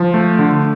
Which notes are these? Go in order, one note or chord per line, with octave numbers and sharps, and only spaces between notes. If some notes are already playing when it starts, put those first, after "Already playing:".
Already playing: F3
A3
D3